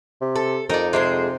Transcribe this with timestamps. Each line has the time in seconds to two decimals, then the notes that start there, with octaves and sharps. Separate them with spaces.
0.21 C3
0.36 A4
0.70 F2 D#4 A#4 D5
0.93 C3 G#3 G#4 C5